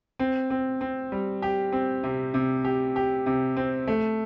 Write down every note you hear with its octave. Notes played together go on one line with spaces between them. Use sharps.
C4
C4
C4
G3
G4
C4
C3
C3
G4
G4
C3
C4
A3